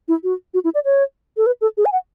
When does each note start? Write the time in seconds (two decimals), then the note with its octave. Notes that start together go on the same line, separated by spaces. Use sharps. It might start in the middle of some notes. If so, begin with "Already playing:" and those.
0.08 E4
0.24 F#4
0.54 F#4
0.64 E4
0.75 D5
0.85 C#5
1.37 A4
1.46 B4
1.61 A4
1.77 G#4
1.85 G#5
1.92 F#5